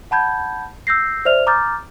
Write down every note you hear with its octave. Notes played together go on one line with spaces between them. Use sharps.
F#5 A5 B5 G6 G#6
E6 G6 A#6 C7
C5 D5 E5 F6 F7
A#5 D6 D#6 F6 G6 A6